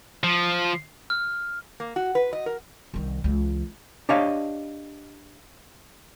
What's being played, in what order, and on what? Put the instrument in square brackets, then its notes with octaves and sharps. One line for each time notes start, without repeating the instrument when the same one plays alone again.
[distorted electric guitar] F3
[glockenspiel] F6
[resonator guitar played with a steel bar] A#3
F#4
B4
D#5
A#4
[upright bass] C2 D#3
C#2 E3
[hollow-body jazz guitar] D4 G4 C#5 D#5 F5